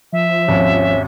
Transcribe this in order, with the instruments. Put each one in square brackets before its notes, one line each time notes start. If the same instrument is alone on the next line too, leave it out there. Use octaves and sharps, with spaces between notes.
[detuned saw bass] F3 [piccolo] E5
[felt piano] G#1 D#2 [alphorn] C#4